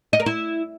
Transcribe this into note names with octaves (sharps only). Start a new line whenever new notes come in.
D#5
A#4
E4